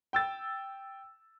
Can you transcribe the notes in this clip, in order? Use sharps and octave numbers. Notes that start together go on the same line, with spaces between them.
G5 E6 A6